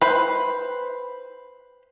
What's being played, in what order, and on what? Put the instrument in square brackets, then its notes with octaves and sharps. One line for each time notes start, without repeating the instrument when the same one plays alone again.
[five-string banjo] B4 C5